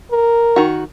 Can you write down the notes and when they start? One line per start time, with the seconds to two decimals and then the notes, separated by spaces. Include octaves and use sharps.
0.12 A#4
0.56 D#3 F#4